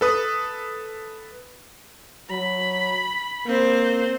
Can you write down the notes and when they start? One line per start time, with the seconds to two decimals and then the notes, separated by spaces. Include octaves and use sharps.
0.01 A4 B4 D#6
2.30 F#3 B5
3.47 A#3 C4 C5